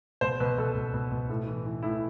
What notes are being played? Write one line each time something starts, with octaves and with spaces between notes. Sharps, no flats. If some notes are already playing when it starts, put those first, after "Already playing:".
B2 C5
B2 B4
B2 A4
B2
B2
B2
A2
E3
E3
A2 E4